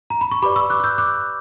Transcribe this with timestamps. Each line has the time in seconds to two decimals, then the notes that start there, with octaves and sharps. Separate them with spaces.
0.10 A#5
0.21 B5
0.31 C#6
0.42 G4 B4 D5 B5 D6
0.56 C#6 E6
0.70 D6 F#6
0.80 F#6
0.84 E6 G6
0.98 D6 F#6